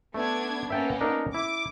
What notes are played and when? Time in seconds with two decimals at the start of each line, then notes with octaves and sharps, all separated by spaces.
0.14 A3 B3 D4 G#6
0.70 A#3 B3 C#4 E5 G5 A5
1.01 D4 D#4 A#4
1.34 E4 D6